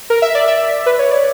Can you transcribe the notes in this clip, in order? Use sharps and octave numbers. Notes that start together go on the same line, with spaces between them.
A#4
E5
D5
E5
B4
C#5
D5